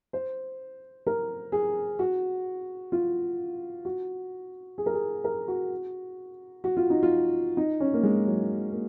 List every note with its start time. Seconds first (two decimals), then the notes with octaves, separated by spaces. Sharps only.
0.13 C5
1.07 A#4
1.52 G#4
1.99 F#4
2.92 F4
3.85 F#4
4.78 G#4
4.86 A#4
4.94 G#4
5.24 A#4
5.48 F#4
6.64 F#4
6.77 F4
6.90 D#4
7.03 F4
7.57 D#4
7.80 C#4
7.94 A#3
8.03 G#3
8.27 F#3
8.73 A#3